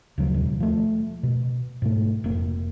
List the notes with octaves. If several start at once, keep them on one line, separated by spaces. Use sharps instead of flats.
D2 C#3 F3 F#3
D#2 B2 G3
F3 A3
B2
G#2 B2 A3
F1 A#3